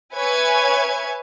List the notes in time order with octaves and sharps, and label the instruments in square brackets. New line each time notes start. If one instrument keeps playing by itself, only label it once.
[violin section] B4 C#5 E5 G#5 C#6 G#6